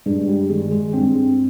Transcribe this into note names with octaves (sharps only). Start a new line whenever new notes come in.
G2 G#3
G3
D#3 G#3
G#3
G2 C4